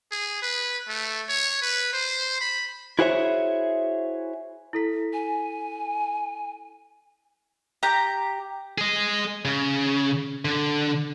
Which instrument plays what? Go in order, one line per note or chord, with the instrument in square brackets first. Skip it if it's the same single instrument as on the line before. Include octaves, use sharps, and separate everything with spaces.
[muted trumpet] G#4
B4
A3
C#5
B4
C5
B5
[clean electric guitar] E4 F#4 G#4 C5 C#5 E5
[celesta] E4 A4 B6
[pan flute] G#5
[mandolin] G4 A#5
[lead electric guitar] G#4 D#5
C#3
D3